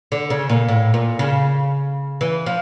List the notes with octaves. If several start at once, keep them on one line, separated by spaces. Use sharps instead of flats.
D3
C#3
A#2
A2
A#2
C#3
E3
F3